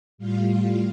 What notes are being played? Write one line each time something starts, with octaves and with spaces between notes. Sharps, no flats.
A2 G3 F4 F5